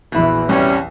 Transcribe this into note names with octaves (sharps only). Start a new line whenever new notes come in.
A#1 E2 B2 E3 E4
C2 G3 C#4